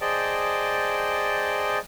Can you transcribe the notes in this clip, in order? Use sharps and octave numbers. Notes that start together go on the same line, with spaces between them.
G#4 C5 D5 D#5 G5 A5